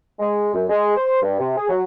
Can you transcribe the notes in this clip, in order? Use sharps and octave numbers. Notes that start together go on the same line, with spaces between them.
G#3
F#2
G#3
C5
G2
C3
G#4
F#3